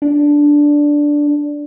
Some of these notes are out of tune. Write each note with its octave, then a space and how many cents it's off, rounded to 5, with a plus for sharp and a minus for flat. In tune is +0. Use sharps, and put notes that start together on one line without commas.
D4 -5